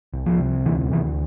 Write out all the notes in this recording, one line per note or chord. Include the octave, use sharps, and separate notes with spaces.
C2
F3
C3
D2 E3
D2 E3